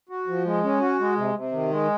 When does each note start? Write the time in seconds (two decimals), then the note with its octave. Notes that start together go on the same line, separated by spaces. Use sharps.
0.09 F#4
0.27 F3
0.45 G#3
0.63 C#4
0.80 F#4
0.99 G#3
1.16 C3
1.35 C3
1.52 D#3
1.71 G#3